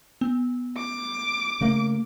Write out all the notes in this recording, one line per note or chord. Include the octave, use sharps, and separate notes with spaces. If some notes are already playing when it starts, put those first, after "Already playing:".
B3
D6
C#3 A3 A#3